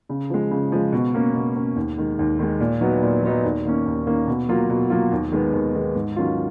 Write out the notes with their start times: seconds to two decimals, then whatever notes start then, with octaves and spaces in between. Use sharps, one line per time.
0.09 C#3
0.30 F3 G#3
0.51 C#3
0.72 F3 G#3
0.92 B2
1.14 A#3 C#4
1.34 B2
1.55 A#3 C#4
1.76 D#2
1.98 D#3 G#3
2.19 D#2
2.39 D#3 G#3
2.60 A#2
2.81 F#3 B3 D#4
3.02 A#2
3.23 F#3 B3 D#4
3.44 D#2
3.65 D#3 A#3 C#4
3.86 D#2
4.07 D#3 A#3 C#4
4.27 B2
4.49 F#3 A#3 F4
4.69 B2
4.90 F#3 A#3 F4
5.12 D#2
5.32 D#3 G#3 B3
5.53 D#2
5.74 D#3 G#3 B3
5.95 G#2
6.16 D#3 F#3 C#4 F4